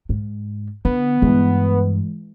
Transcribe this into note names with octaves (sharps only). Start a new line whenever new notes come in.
G#2
D3 B3
G2 E3 G#3